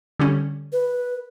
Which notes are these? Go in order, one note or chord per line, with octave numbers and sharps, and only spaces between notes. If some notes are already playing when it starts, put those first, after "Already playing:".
D3 G3 C#4
B4